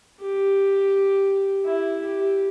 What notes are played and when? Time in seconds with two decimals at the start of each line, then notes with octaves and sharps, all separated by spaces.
0.20 G4
1.65 E4
2.02 G4